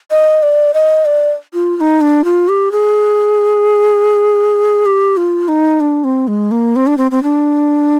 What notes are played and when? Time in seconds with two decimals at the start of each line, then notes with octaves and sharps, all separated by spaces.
0.11 D#5
0.43 D5
0.74 D#5
1.05 D5
1.54 F4
1.77 F4
1.81 D#4
2.01 D4
2.24 F4
2.49 G4
2.72 G#4
4.86 G4
5.17 F4
5.48 D#4
5.80 D4
6.04 C4
6.28 G#3
6.51 A#3
6.76 C4
6.87 D4
6.97 C4
7.11 C4
7.23 D4